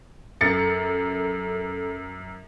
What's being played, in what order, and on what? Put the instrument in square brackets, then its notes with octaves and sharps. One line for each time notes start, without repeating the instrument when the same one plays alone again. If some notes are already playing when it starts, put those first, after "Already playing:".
[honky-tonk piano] F#2 A6 C#7 [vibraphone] A4